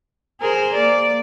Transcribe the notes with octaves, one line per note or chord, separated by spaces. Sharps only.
G#4 A#4 C5
A#3 D5